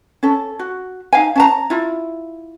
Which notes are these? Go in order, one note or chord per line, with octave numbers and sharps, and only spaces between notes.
C#4 A4
F#4
D#4 F5 G#5
C#4 A5 A#5
E4 F4